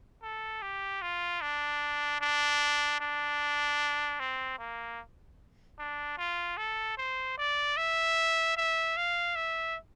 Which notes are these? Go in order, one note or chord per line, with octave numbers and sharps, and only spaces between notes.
A4
G4
F4
D4
D4
D4
C4
A#3
D4
F4
A4
C5
D5
E5
E5
F5
E5